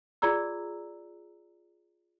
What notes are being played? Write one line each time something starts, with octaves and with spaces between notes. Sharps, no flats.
F4 G#4 D5 A#5 E6